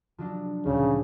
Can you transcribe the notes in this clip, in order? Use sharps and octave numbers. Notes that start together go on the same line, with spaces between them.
F3 F#3 D4
D2 A#2 C#3